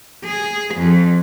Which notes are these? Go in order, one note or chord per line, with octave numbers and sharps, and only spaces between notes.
G#4
F2